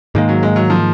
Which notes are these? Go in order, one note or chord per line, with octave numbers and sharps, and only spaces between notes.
G#2 D#3 G#3 A#3
F#3
G#3
F#3
F3